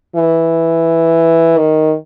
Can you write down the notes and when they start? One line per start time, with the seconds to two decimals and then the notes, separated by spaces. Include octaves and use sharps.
0.16 E3
1.58 D#3